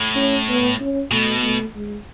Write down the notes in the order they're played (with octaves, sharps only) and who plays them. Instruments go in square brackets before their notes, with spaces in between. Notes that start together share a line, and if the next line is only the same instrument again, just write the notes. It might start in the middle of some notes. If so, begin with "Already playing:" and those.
Already playing: [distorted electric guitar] A2
[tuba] C#4
B3
C#4
[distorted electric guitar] B2 [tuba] A3
[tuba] A3
G#3